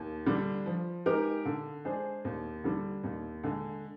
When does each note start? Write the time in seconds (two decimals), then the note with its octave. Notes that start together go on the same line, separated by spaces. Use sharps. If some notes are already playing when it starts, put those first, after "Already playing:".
Already playing: D#2
0.26 D3 G3 D4
0.66 F3
1.06 G#3 D#4 G4 A#4
1.45 D3
1.85 G#3 D4 G#4 C5
2.25 D#2
2.64 D3 G3
3.03 D#2
3.43 D3 G#3